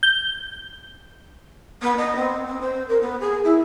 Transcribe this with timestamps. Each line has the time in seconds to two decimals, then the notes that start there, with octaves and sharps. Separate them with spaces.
0.03 G6
1.82 B3
1.97 D#5
2.16 C4
2.46 C4
2.61 C5
2.88 A#4
3.01 B3
3.20 G#4
3.44 E4